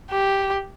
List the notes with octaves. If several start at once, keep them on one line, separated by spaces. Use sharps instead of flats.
G4